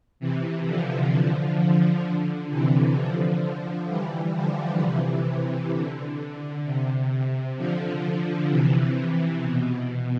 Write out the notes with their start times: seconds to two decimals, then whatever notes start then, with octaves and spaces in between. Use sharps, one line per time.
0.20 C3 E3
0.66 D3 F3
1.58 D3 F3
2.04 D3
2.50 C3 E3
2.97 D3 F3
3.88 E3 G3
4.35 D3 F3
4.80 C3 E3
5.73 D3
6.19 D3
6.65 C3
7.57 D3 F3
8.50 C3 E3
8.95 C3
9.42 B2
9.87 B2